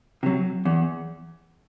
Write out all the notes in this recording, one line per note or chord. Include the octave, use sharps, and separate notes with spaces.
C3 F#3
E2